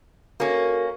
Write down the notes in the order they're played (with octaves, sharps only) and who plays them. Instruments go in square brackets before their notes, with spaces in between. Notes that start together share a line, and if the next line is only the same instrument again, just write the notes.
[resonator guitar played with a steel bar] A#3 C#4 [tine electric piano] F#4 A4 A#4